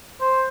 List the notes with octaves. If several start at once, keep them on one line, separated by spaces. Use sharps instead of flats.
C5